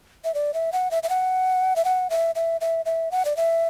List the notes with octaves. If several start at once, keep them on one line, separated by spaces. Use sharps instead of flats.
E5
D5
E5
F#5
E5
E5
F#5
E5
F#5
E5
E5
E5
E5
F#5
D5
E5